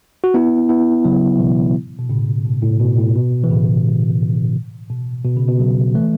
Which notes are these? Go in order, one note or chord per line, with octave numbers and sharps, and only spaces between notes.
F#4
B3 E4
B3 E4
C#3 F#3
B2 E3
B2
A2 C#3
B2
A2
B2
A2
B2
E3
A2 C#3
B2
B2
C#3
B2
C#3 F#3
E3 A3